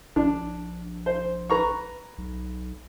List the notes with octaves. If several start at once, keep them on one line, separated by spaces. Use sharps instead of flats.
A#1 D4
C5
B4 A#5 C#6
B1